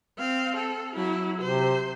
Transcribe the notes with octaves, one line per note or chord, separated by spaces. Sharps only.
C4 F5
A4
F#3 E4
C3 C5